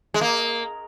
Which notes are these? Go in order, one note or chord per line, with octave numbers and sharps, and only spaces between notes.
G#3
A#3